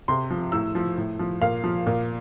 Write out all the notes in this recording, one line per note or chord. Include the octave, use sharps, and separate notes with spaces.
C3 C6
F3
A2 E6
F3
A2
F3
A#2 F5
F3
A#2